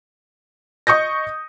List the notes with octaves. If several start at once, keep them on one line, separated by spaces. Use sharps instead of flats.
D#5 C#6 D#6 G6 A#6